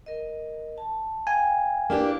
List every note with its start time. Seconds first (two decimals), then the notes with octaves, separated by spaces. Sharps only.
0.06 A#4 D#5
0.78 A5
1.27 F5 G5 G#5
1.90 A#3 D4 E4 G4 B4